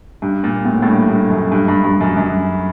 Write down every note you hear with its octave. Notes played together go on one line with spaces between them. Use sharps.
G2
A#2
A2
A2
G2
G2
F#2
G2
G2
G2
F#2
F#2